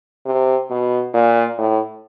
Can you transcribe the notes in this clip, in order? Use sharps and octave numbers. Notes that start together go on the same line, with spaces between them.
C3
B2
A#2
A2